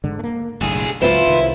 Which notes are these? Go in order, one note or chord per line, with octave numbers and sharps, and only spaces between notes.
G#2 D3
A3 A#3
F#1 B1 A2 D3 G#4
C#2 G#2 F#3 E4 F4 B4 C5
C2 D#3